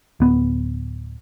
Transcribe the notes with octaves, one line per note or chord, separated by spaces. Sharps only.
D1 B3